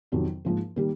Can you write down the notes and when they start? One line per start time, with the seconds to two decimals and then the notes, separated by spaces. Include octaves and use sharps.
0.12 F2 C3 D#3 F#3
0.45 G#2 F3 A#3
0.76 D#3 G3 A#3